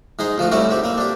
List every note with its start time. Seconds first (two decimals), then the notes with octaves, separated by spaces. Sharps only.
0.19 G#2 D#4 G#4 C6
0.38 D2 F3 F4 F#4
0.51 G3 A3 C4 C#4 E4 F#4
0.69 G#2 C4 G4
0.84 A#3 C4
0.98 D4 G4